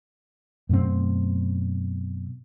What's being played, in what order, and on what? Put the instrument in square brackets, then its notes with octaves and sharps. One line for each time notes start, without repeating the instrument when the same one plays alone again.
[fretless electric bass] F#2 B2 A3 C4